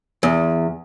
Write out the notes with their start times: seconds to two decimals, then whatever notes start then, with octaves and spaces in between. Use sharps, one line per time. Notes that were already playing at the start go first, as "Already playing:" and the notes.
0.23 E2